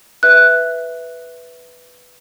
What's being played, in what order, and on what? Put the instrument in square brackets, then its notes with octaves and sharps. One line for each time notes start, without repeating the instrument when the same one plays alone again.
[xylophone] B4 E5 F#6